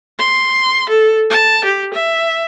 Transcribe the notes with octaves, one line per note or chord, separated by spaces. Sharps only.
C6
A4
A5
G4
E5